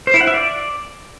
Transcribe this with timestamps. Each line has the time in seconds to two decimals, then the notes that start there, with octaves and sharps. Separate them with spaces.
0.07 C5
0.14 E4
0.21 F#5
0.27 E5
0.34 D5